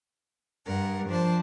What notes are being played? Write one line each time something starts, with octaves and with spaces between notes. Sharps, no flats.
G2 A#4 F#5
F3 D4 C5 A5